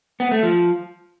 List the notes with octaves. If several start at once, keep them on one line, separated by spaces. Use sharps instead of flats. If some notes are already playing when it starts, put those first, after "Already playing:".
B3
A3
F3